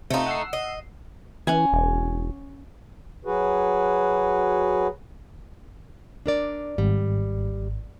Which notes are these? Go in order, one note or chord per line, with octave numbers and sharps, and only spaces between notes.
C3 A3 D#4 F4
F#5 E6 C7
D#5
E3 C#4 F#5 G#5
E1
F#3 F#4 G#4 B4
D4 A#4 D5
G#1 G3